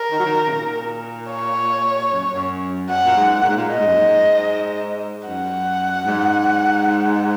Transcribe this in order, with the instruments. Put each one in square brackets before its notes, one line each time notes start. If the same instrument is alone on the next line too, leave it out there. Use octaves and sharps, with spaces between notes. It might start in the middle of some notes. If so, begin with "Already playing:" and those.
Already playing: [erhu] A#4
[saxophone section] D#3
F#3
D#3
C#3
A#2
[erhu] C#5
[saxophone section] F#2
F#2
[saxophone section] F#2 [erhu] F#5
[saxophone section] A#2
G#2
A#2
G#2
A#2
[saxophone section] A#2 [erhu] D#5
[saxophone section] G#2
F#2
G#2
[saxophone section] F#2 [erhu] F#5
[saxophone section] G#2